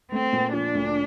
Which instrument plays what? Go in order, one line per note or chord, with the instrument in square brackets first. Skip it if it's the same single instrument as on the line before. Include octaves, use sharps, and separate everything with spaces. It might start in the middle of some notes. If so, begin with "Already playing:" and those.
[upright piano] A3 [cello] C4
[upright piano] A#2
[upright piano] F3 [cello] D4
[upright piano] D2